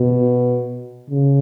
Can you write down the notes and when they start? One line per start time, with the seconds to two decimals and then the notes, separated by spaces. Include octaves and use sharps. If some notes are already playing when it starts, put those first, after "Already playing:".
Already playing: B2
1.10 C#3